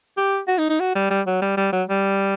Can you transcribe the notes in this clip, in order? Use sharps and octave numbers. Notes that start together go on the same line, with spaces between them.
G4
F#4
D#4
D#4
F#4
G3
G3
F#3
G3
G3
F#3
G3